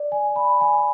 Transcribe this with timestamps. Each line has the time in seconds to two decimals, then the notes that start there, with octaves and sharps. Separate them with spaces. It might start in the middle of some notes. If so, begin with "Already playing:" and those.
Already playing: D5
0.12 G#5
0.36 B5
0.61 G#5